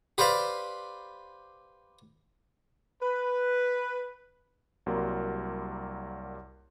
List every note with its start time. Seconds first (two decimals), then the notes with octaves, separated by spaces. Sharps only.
0.18 G4 B4 C5 D5 F5
3.02 B4
4.86 C2 F#3 G3 A#3 A#4 C6